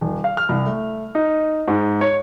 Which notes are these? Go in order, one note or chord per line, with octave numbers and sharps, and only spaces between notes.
D#1
F5
F6
C2
A3
D#4
G#2
C#5